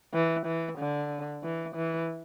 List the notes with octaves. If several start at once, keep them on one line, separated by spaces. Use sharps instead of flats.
E3
E3
D3
E3
E3